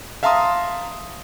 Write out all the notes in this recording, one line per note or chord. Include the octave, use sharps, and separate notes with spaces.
E5 F5 A5 A#5 C6 D#6